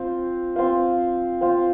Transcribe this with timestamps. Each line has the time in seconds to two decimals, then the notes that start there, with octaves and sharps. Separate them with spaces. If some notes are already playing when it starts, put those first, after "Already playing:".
Already playing: C4 F4 C5 F5
0.56 C4 F4 C5 F5
1.41 C4 F4 C5 F5